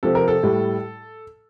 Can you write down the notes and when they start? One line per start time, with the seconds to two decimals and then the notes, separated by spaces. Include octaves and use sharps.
0.03 C3 F3 A4
0.15 A#4
0.28 A4
0.43 A2 G3